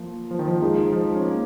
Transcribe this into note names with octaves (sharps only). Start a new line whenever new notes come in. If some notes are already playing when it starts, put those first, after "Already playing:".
Already playing: F3 A#3
F3
D#3
F3
G#3 D#4 G#4
F3
C#4
A#3